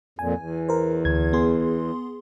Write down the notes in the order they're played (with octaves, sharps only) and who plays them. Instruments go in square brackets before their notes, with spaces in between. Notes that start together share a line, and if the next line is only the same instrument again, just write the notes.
[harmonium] F2 A#2 [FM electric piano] G#5
[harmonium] E2
[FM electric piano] A#4 C5
D2 G#6
B3 G#4 C6